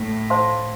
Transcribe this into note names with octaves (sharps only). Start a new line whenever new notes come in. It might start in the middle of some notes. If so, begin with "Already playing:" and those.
Already playing: A2
C5 F5 A5 C6